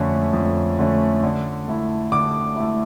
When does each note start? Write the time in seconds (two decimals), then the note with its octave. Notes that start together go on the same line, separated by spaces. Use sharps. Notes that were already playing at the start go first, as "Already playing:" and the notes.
Already playing: F2 D3 A3 C#4
0.33 F2
0.79 D3 A3 C#4
1.23 D3
1.68 A3 E4
2.12 D3 D6
2.56 A3 E4